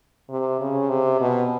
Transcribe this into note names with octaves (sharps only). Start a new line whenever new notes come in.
C3
C#3
C3
B2